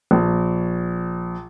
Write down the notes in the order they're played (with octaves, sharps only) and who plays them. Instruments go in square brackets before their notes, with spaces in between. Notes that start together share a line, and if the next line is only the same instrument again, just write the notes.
[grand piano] A#1